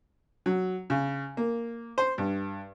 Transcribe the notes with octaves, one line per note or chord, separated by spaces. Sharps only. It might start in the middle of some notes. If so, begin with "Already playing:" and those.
F#3
C#3
A#3
C5
G2